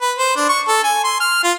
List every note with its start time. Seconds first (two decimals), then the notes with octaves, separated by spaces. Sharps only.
0.01 B4
0.18 C5
0.36 D4
0.49 C#6
0.68 A4
0.83 G#5
1.04 C6
1.20 F6
1.43 F4